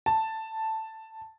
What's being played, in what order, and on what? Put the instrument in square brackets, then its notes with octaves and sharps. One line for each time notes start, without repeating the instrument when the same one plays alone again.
[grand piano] A5